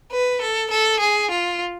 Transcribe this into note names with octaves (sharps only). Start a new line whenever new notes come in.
B4
A4
A4
G#4
F4